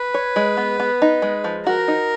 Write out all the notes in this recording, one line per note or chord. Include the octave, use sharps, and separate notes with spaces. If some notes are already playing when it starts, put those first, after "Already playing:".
Already playing: B4
C#5
G#3
B3
B3
D#4
G#3
F3
F#4 A#4
D#4